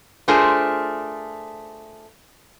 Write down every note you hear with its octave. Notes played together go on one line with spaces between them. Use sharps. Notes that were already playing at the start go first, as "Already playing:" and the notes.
A3 D4 F4 G#4 A#4 C5